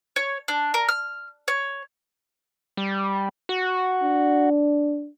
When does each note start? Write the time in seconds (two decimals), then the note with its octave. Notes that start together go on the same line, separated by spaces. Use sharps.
0.16 C#5
0.48 D4
0.74 A#4
0.89 F6
1.48 C#5
2.77 G3
3.49 F#4
4.04 D4